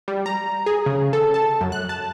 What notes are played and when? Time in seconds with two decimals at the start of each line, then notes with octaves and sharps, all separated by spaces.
0.08 G3
0.26 A#5
0.66 G#4
0.86 C#3
1.13 A4
1.34 A5
1.61 F#2
1.72 F#6
1.89 A5